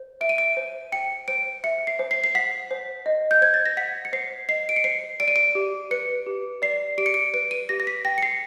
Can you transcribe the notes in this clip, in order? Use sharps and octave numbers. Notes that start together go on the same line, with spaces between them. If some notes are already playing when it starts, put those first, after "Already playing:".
Already playing: C5
E5 D7
D#7
D7
C5
G5 C#7
C5 D7
E5 C#7
C7
C5
C7
C7
F#5 B6
C5
D#5
G6
C5 G#6
A6
A#6
F#5 B6
C#7
C5 C7
D#5 C7
D7
C#7
C5 C7
D5 D7
D#7
D7
G4
B4 C#7
G4
D5 C7
G4 D7
C#7
D7
B4 D7
D#7
G4 A#6
A#6
B6
G5 A#6
C#7
C7